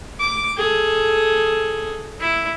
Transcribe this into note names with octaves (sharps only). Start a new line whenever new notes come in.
D6
G#4 A4
E4